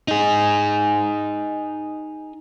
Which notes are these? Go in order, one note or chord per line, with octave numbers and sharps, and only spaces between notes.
D#4 G#4